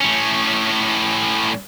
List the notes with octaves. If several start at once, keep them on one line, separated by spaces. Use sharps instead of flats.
A2 C#4